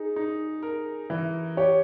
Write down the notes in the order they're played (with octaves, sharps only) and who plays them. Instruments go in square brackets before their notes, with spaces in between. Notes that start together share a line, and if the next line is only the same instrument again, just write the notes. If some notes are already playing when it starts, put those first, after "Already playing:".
Already playing: [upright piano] D#4 [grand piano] G#4
[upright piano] D#4
A#4
E3
[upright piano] G4 [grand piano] C#5